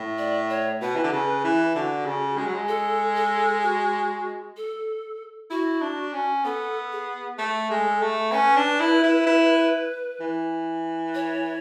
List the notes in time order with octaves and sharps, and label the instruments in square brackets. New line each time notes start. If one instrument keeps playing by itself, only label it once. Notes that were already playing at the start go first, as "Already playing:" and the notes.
Already playing: [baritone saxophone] A2
[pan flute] D5
C#5
[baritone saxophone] B2 [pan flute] B4
[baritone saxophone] E3
D3
C#3
E3
[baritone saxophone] D3 [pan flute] F#4
[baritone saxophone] C#3
G#3
F#3
G#3
[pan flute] A4
A4
F#4
A4
[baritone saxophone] E4 [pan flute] F#4
[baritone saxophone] D4
C#4
[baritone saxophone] B3 [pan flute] A4
[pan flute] G#4
[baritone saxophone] A3 [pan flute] A4
[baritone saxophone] G#3
A3
[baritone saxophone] C#4 [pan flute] B4
[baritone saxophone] D4
E4
E4
E4
E3
[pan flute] C#5